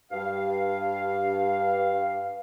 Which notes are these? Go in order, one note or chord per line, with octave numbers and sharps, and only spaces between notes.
G2 F5